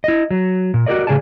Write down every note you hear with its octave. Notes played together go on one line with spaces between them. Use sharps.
E4 D#5
F#3
A#2
F#4 G4 A4 A#4 D5 D#5
A2 C#3 G#4 D5 G#5 A5